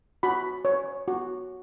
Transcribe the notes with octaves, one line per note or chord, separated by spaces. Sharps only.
F#4 B5
C#5
F#4